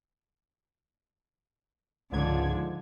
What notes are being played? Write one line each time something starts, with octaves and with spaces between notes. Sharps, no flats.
C#2 G#2 D3 F3 G#6